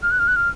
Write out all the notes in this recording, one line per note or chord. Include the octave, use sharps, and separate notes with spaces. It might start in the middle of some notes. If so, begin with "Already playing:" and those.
F6
F#6
F6
F#6
F6